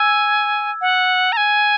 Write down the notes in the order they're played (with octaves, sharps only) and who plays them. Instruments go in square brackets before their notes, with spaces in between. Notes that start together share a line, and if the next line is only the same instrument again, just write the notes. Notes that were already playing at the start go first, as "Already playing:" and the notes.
Already playing: [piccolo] G#5 [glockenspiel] E6 G#6
[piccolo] F#5
A#5
G#5